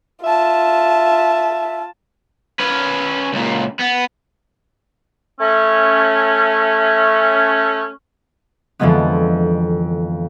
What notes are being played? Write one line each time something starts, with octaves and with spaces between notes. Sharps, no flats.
F4 E5 A5
C#4 B4
C#2 A#2
B3
A3 C#4
F2 D3 E3 F3 G#3 B3